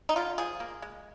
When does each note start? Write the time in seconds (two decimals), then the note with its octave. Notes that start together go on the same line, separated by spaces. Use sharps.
0.09 D#4
0.16 D3 F4
0.38 F3 G#4
0.60 A#3
0.82 G#3